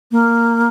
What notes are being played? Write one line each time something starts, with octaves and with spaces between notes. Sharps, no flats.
A#3